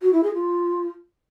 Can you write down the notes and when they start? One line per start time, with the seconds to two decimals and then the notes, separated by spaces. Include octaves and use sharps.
0.02 F#4
0.13 E4
0.23 G#4
0.34 F4